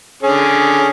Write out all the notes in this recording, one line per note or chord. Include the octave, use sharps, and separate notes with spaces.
D3 C#4 G#4